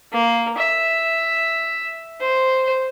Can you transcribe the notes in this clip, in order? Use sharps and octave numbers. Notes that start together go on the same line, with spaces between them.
A#3
E5
C5